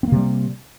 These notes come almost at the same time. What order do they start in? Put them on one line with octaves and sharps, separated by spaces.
C4 A#3 C3 G3